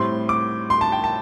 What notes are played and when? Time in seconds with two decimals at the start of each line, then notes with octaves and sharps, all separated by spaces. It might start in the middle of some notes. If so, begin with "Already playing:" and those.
Already playing: A2 G3 C4 C6
0.29 D6
0.70 C6
0.81 A5
0.92 G5
1.04 A5